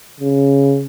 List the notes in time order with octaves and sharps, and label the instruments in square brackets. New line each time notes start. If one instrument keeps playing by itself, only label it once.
[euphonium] C#3